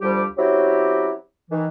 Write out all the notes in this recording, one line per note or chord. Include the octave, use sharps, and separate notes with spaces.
D2 F3 G3 G4
F#3 C4 C#4 E4 F#4 G4
D#3 E3